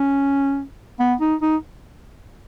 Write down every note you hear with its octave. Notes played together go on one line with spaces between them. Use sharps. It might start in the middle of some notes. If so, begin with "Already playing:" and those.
Already playing: C#4
B3
D#4
D#4